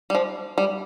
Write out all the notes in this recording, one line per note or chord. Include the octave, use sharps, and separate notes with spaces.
G3
F3
G3